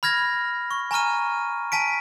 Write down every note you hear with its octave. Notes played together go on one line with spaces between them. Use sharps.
B5 F6 G#6 A#6
C#6
G#5 A#5 C#6 F6 D#7
G#5 A5 B6 D7